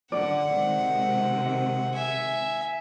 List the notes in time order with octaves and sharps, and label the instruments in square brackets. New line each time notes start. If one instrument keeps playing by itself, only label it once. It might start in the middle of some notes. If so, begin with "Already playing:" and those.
[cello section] D3 [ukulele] D5 [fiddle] F#5
[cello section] C3 D#3 G#3
[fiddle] E5 G#5